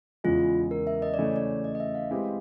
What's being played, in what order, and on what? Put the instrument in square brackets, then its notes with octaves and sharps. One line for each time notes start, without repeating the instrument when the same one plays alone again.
[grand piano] E2 C#3 E3 G#3 [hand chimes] F4
[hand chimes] A#4
E5
D#5
[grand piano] C#3 E3 A3 [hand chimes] D5
[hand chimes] C#5
D5
D#5
D#5
E5
F5
[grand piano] G#3 C4 E4 G4 B4